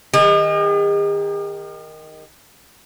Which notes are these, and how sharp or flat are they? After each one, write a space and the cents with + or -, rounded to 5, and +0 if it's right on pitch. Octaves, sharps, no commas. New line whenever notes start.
D#3 +0 G#4 -45